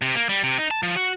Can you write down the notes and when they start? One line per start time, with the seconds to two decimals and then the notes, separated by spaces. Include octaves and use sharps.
0.02 C3
0.16 A#3
0.29 G3
0.43 C3
0.58 D#4
0.71 A5
0.83 F3
0.96 F#4